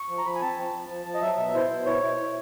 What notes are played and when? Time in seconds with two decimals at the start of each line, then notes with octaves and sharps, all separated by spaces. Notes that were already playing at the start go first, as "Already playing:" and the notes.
Already playing: C#6
0.09 F3
0.18 A#5
0.26 F3 B5
0.35 G#5
0.41 C4 A5
0.57 F3
0.74 F3
0.89 F3
1.06 F3
1.15 D#5
1.22 F#3 E5
1.37 B2
1.54 E4 C5
1.70 B2
1.86 E4 C#5
2.02 E4
2.19 E4